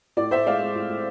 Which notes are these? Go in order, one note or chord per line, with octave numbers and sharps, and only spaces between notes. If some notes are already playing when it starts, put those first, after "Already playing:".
A2 D5
A2 C5 E5
G#3 D5 F5
G#3
A2
A2